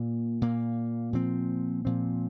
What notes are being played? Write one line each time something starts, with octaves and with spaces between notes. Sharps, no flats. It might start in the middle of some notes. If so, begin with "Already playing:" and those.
Already playing: A#2 A#3
A#2 A#3
A#2 F3 C4
A#2 F3 C4